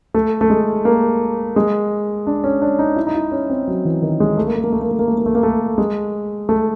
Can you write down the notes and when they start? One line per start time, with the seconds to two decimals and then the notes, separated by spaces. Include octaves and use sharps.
0.14 A3
0.41 A3
0.50 G#3
0.85 A#3
1.56 G#3
2.27 D4
2.44 C#4
2.62 D4
2.79 D#4
2.96 E4
3.07 D#4
3.15 E4
3.32 C#4
3.50 C4
3.68 F#3
3.85 E3
4.02 D#3
4.20 G#3
4.37 A3
4.46 A#3
4.55 A3
4.64 A#3
4.72 A3
4.81 A#3
4.91 A3
4.99 A#3
5.08 A3
5.18 A#3
5.26 A3
5.35 A#3
5.43 A3
5.78 G#3
6.49 A3